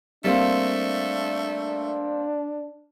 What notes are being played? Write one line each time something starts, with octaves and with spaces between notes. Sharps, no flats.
G3 A3 A#3 C4 D4